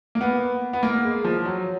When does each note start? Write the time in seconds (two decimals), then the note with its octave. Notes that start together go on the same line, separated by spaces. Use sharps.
0.15 A#3
0.21 B3
0.73 B3
0.83 A#3
1.04 G#3
1.24 F3
1.45 F#3